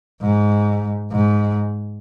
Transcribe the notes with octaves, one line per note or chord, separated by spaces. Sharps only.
G#2
G#2